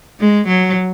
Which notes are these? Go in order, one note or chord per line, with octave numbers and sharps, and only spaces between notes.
G#3
F#3